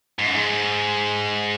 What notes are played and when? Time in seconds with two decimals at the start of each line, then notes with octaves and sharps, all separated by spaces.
0.19 G#2
0.27 F#2
0.35 G#2